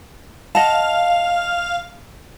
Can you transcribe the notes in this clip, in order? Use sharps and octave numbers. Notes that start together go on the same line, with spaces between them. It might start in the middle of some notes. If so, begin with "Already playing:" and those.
D#5 F5 F#5 A5